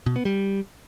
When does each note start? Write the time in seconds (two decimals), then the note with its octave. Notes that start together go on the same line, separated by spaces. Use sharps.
0.06 B2
0.16 B3
0.25 G3